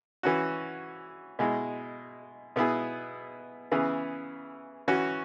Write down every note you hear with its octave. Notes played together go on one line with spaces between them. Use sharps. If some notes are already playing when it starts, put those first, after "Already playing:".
E3 C#4 F#4
B2 G#3 E4 G#4
B2 B3 E4 G#4
C#3 E3 B3 E4 G#4
E3 C#4 F#4